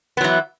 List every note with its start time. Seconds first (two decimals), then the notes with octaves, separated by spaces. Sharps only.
0.17 B3
0.21 F#3
0.24 E3